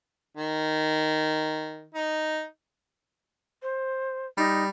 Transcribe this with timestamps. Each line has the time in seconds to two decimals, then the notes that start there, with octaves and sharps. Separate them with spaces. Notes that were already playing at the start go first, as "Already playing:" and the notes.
0.37 D#3
1.94 D#4
3.63 C5
4.37 G3 D#4